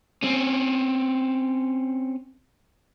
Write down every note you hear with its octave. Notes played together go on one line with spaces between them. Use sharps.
C4 C#4